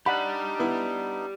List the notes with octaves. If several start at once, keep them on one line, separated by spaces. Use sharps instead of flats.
D4 D#4 G4 D5 F#5 B5
B3 E4